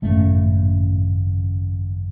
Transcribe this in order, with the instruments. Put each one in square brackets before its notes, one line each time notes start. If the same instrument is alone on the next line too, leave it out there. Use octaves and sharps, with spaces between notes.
[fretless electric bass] G#1 F#2 A2 C#3 A3